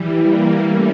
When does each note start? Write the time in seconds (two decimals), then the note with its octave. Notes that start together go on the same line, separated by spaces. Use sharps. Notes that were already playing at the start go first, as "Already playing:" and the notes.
Already playing: E3 G3
0.15 G3 A#3
0.62 A3 C#4